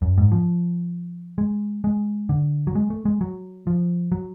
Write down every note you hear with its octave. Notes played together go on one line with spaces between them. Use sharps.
F#2
G#2
F3
G#3
G#3
D3
F#3
G#3
A3
G#3
F#3
F3
F#3